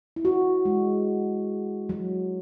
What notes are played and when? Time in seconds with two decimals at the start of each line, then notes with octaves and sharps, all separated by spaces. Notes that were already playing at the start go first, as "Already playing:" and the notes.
0.16 E4
0.25 F#4
0.65 G#3
1.89 F#3